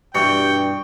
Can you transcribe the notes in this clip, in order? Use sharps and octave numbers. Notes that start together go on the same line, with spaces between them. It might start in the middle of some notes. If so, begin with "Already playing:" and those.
G2 B2 E3 G3 G5 C#6